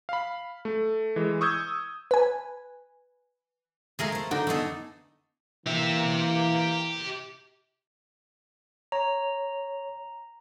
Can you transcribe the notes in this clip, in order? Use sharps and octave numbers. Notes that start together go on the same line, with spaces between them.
F5 B5
A3
E3 G#3
C#6 D#6 E6 G6 G#6
B4 G#5
D3 G#3 A3 G#4 A#4 F5
A3 C5
D3 D4 D#4 A#4 G5
A3 B3 D#4 G#4 A4
E3 A#3 G4 E5
C#5 A#5